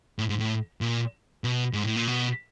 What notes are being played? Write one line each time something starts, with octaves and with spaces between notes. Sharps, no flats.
A2
G#2
A2
A#2
B2
G#2
A2
A#2
B2